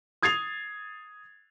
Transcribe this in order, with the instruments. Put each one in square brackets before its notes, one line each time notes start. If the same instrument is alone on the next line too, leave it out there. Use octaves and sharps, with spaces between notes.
[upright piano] D#6 G#6 A6 C7 F7